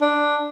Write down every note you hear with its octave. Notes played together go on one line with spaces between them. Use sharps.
D4